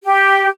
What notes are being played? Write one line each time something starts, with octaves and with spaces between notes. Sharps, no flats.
G4